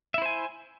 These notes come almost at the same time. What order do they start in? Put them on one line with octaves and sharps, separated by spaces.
E5 E4 C5 G#5